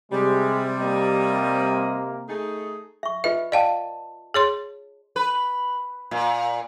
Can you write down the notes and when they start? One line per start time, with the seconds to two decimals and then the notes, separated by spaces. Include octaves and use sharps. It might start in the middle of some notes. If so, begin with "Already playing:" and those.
0.12 C3 G3 G#3 G4
0.81 A#3 D#5
2.28 A3 D#4 G#4
3.03 E5 C#6
3.24 F4 B4 D#5 E5
3.52 D5 D#5 F5 G5 A5
4.34 G#4 C#5 C6
5.16 B4
6.11 A#2